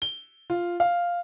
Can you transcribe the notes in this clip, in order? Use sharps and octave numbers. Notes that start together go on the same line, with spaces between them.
G7
F4
F5